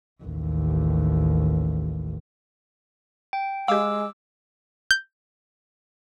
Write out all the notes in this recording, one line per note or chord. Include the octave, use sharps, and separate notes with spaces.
A1 D#2
G5
G#3 G4 F5 D6 E6
G6